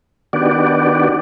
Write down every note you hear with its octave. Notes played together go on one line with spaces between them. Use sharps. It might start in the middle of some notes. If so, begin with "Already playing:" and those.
D#3 B3 D4 F#4 G4 D5